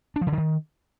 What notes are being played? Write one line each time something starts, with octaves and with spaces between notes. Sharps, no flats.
D4
F3
C#3
D3
D#3